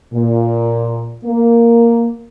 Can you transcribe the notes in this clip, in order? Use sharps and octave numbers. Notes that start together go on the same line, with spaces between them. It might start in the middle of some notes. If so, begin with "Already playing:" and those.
A#2
A#3